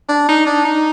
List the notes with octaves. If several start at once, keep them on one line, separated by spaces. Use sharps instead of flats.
D4
D#4
D4
D#4